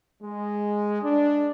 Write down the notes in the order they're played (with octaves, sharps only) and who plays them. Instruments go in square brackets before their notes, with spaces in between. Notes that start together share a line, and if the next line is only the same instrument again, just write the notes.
[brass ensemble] G#3
D4